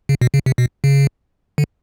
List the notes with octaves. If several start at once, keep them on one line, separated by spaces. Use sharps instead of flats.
C#3
B2
C#3
C3
B2
C#3
D3